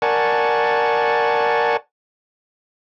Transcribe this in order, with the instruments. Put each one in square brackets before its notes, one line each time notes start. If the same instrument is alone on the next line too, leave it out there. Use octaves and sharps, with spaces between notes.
[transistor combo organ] A#4 D5 F#5 G#5 A5 C#6